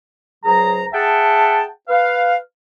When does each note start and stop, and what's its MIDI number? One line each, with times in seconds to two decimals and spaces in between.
0.44 0.85 37
0.44 0.85 54
0.44 0.85 68
0.44 0.85 72
0.44 0.85 82
0.92 1.64 68
0.92 1.64 76
0.92 1.64 78
0.92 1.64 79
0.92 1.64 81
1.88 2.35 71
1.88 2.35 77